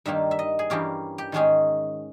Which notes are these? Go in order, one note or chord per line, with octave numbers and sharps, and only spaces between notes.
G2 D#3 G3 A#3 E5
E5
D#5
G#4
G2 E3 A#3 C#4 G4
G4
G#2 D#3 G#3 C#4 G#4